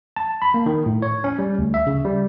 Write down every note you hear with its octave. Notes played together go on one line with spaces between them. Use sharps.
A5
B5
A#3
D#3
A2
C#5
C#4
G3
D2
E5
C#3
G3